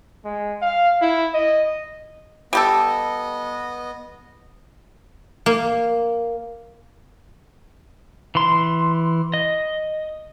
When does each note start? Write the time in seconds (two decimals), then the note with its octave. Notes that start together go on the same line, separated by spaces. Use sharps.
0.25 G#3
0.62 F5
1.02 E4
1.34 D#5
2.53 G3 B3 G4 A4 D#5
5.46 A#3
8.35 E3 C6
9.34 D#5